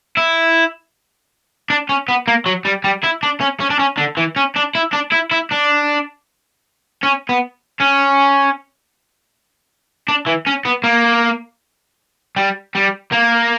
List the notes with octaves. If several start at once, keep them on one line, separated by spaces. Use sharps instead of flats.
E4
D4
C#4
B3
A#3
F#3
G3
G3
E4
D4
C#4
C#4
D4
C#4
D3
E3
C#4
D4
E4
D4
E4
E4
D4
C#4
B3
C#4
D4
E3
C#4
B3
A#3
G3
G3
A#3